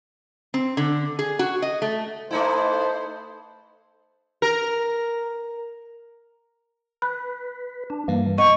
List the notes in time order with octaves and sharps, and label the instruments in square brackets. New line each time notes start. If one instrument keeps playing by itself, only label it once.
[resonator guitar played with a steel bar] C4
D3
G#4
F#4
D#5
A3
[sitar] A3 D#4 E4 [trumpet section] B3 B4 A5 [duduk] C5
[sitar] A#4
[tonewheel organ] B4 [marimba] B5
[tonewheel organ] D4
[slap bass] G2 [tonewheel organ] E3 A#3
[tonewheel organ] B3 [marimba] D#5 [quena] C#6